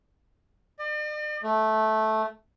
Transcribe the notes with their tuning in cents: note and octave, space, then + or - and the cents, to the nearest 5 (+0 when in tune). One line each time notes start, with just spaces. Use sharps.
D5 +45
A3 -10